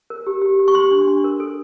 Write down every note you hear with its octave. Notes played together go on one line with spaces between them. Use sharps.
A#4
G4
G4
G4
C#6
G4 C6
D4
D4
A#4
A4